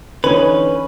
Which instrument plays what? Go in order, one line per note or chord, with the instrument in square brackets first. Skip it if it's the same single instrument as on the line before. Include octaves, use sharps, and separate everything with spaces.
[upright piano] D3 E3 D#4 [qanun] C#4 [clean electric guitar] B4